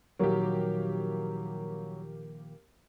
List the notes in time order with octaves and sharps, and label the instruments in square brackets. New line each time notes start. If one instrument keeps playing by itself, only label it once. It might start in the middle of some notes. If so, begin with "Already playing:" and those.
[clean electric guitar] A#2 D#3 F3 [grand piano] F#3 [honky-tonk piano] A#3 G4